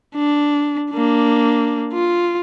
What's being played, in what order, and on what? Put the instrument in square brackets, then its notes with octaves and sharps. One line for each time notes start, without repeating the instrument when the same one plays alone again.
[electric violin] D4
A#3 D4
F4